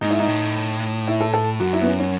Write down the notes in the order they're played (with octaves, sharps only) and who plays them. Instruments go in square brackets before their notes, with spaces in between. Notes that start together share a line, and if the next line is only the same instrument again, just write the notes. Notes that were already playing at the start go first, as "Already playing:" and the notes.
[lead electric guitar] G#2 [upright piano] D#4
[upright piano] E4
D#4
[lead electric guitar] A2
[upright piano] E4
A4
A4
[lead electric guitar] F#2 [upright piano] F#4
[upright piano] E4
B3
C#4
C#4